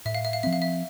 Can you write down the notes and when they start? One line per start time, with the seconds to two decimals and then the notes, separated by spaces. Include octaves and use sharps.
0.05 A2 E5
0.15 F5
0.25 E5
0.33 F5
0.43 F3 C4 E5
0.53 F5
0.62 E5